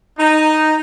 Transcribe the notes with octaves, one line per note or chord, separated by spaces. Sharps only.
D#4